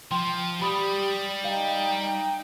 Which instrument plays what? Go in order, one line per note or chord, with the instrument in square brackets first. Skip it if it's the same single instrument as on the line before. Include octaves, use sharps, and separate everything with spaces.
[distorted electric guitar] F3 [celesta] G5 C6
[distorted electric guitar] G3 [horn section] G4 [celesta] B5 D#6
[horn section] D#4 [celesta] F5 [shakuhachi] G5